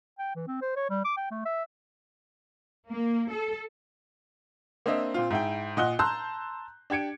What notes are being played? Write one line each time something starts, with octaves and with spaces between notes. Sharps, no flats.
G5
E3
C4
C5
C#5
G3
D6
G5
A3
E5
A#3
A4
A#3 C4 D4 D#5 E5
A#2 C4 F4
G#2 E4 G5
A#2 D#5 F#5 F#6 G7
A5 A#5 C6 E6 F#6 G6
D4 G4 G#6 C#7 D7